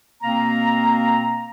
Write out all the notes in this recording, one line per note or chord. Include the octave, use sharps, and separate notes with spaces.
B2 A#3 C4 F5 A#5